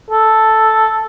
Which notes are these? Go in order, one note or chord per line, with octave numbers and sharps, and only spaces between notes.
A4